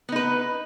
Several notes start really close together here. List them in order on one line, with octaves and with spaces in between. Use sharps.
B3 D#4 B4